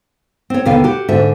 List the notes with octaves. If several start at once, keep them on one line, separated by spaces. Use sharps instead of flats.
C4 C#5
D#2 B2 D3 B3 F5 G5
F#4 G4
G#2 D3 E5